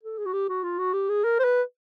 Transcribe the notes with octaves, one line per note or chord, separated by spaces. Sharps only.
A4
G#4
F#4
G4
F#4
F4
F#4
G4
G#4
A#4
C5
B4